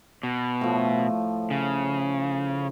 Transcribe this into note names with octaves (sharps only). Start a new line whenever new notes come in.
B2
A2 F3
C#3